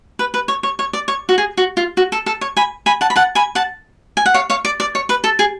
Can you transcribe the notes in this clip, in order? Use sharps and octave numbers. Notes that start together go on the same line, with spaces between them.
B4
B4
C#5
C#5
C#5
D5
C#5
F#4
G#4
F#4
F4
F#4
A4
A4
C#5
G#5 B5
G#5 B5
F#5 A5
B5
F#5 A5
G#5 B5
F#5 A5
G#5
F#5
C#5 F5
C#5 F5
D5
D5
C#5
B4
A4
G#4